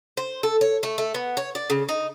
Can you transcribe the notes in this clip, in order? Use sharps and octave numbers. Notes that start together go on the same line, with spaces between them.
C5
A4
C#5
A3
A3
B3
C#5
D5
C#3
D#4